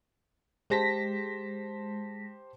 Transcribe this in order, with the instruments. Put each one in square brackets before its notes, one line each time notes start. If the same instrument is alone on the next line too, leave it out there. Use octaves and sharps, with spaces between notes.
[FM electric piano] G#3 A#6 B6 [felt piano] G4 C5 A5